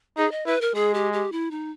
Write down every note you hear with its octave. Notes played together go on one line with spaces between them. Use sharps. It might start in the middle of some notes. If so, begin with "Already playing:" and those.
D#4 G#4
D#5
E4 B4
A#4
G#3 G#4
G4
G4
E4
D#4